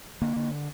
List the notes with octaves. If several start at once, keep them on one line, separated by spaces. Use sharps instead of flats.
D3 A#3
D3